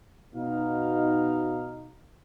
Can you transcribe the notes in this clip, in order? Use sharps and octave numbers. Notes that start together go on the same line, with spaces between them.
B2 D#4 F5